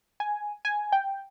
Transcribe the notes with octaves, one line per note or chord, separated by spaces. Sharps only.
G#5
G#5
G5